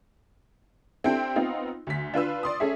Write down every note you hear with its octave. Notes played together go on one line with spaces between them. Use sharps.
C4 D4 E4 G4 A4 G5
B3 C4 D#4 F4
D2 B6
D4 F4 B4 E6
D5 C6 D#6
C#4 G#4 A4 E5